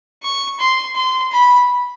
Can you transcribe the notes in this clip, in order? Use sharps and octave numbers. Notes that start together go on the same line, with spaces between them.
C#6
C6
C6
B5